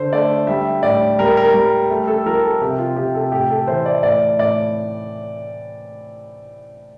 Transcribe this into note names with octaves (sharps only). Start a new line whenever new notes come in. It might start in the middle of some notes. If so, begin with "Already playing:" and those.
Already playing: D3 C5
A3 D5
G3 E5
A2 D5
G3 A#4
A#4
G3
A3
A4
F3 A#4
A4
C3 G4
F4
C3 G4
A4
A2 G4
A4
E3 C5
D5
A2 D5
A2 D5